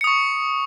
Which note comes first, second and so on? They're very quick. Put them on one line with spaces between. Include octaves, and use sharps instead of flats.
C#7 D#6 C#6